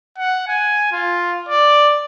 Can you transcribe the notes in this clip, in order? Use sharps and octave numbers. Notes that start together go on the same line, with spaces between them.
F#5
G#5
F4
D5